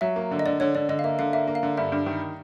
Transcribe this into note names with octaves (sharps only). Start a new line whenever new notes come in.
F#3 E5
A#3
D3
D#5
D3 D5
D3 C#5
D3 D5
D3 D#5
F5
A#3 E5
D3 F5
A#3 E5
A#3
F5
D3
G2 E5
G2
D#3